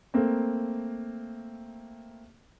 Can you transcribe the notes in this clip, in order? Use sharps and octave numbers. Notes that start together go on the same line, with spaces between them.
A3 A#3 C4